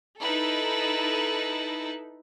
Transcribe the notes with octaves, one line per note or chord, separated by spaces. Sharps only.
D#4 E4 A4 B4